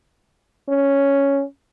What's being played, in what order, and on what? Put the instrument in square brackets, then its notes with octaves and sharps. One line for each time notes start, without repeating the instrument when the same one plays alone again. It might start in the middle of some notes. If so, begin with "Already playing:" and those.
[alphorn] C#4